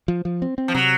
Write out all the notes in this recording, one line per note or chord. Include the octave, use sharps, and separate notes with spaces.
F3
F3
C4
C4
F3
C3 F#3